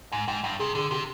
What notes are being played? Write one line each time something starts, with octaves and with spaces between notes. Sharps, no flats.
G#2 G#5
G#2 G5
G2 G5
C3 G#4
D3 G#4
C3 G4